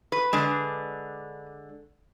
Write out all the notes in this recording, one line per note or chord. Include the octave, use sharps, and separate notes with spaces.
B4
D3 G#3 D4